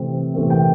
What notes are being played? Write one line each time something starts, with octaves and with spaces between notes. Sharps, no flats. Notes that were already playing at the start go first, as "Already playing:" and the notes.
Already playing: C3 E3 A3 C4
C3 E3 A3 C4
G5